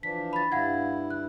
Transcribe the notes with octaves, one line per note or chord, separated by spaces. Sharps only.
E3 F3 D4 B6
B5 A6
G2 E4 F5 F#5 G#6
F#6